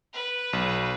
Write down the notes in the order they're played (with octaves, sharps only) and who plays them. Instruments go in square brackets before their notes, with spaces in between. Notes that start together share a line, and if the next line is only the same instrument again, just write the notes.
[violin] B4
[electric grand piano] B1